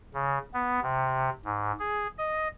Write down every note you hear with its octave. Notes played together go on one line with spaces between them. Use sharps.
C#3
B3
C3
G#2
G#4
D#5